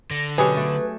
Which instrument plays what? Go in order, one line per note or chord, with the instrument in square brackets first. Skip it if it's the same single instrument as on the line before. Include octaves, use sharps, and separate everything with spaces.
[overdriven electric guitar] D3 [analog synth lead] A#6
[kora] B2 F#3 G4 [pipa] C#4 G#4 [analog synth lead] B4
[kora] A3